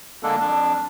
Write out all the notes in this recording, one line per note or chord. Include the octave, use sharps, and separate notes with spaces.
D3 G#3 A#3 D4 A4
F2 D4